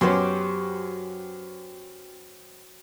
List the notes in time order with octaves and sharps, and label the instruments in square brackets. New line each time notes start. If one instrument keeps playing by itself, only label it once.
[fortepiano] F#2 B3 C#4 [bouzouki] F#3 G4 C5